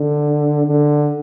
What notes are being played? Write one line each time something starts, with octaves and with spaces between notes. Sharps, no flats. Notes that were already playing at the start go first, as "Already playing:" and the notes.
Already playing: D3
D3